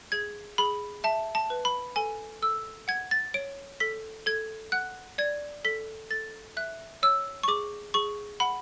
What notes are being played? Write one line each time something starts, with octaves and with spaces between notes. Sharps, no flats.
G#4 G#6
G#4 B5
E5 A5
A5
B4
B5
A4 G#5
A4 E6
F#5 G#6
A6
C#5 D7
A4 B6
A4 G#6
F#5 F#6
D5 G#6
A4 B6
A4 A6
E5 F#6
C#5 E6
C#6
G#4 D6
G#4 C#6
F#5 B5